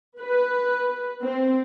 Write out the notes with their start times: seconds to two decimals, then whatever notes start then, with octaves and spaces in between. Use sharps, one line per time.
0.19 B4
1.22 C4